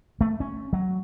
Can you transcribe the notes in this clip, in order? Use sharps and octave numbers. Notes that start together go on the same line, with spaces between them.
A3
C#4
F#3